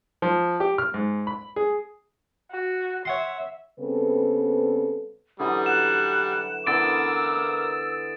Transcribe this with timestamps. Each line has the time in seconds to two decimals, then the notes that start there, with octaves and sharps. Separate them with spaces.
0.22 F3
0.60 G4
0.78 F6
0.94 G#2
1.27 B5
1.56 G#4
2.51 F#4
3.05 C#5 E5 F#5 C6
3.80 C#3 G3 B3 C4 A4 B4
5.39 D3 E3 F#3 G3 D#6
5.66 F#5 E7
6.67 D3 E3 B3 A#4 D6 E6 A6 D7